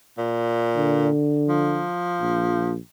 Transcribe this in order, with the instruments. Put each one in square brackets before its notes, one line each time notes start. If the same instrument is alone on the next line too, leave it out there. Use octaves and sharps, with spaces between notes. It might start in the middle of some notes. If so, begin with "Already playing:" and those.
[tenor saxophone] A#2
[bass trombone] D3
[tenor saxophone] F3
[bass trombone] A#1